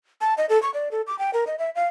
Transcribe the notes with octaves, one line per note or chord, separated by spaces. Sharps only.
A5
D#5
A4
C#6
D5
A4
D6
G5
A#4
D#5
E5
F5